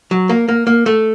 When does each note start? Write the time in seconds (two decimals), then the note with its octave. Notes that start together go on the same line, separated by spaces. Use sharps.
0.11 F#3
0.29 A#3
0.49 A#3
0.67 A#3
0.86 A3